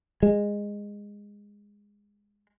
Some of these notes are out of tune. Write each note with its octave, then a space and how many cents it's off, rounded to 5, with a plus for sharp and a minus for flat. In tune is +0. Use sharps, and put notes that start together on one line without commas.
G#3 -15